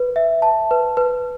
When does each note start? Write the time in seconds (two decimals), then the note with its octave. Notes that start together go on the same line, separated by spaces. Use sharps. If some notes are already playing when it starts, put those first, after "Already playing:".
Already playing: B4
0.16 E5
0.42 A5
0.71 B4
0.97 B4